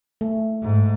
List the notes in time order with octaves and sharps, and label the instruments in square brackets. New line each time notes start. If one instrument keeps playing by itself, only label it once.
[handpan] A3
[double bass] G#2